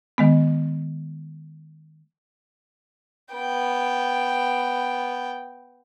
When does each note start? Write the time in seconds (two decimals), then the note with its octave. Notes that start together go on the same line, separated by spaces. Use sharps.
0.18 D#3 G#3 B3
3.33 B3 G5